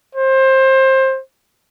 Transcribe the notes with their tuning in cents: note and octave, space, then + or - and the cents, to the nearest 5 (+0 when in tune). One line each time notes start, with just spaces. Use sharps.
C5 +20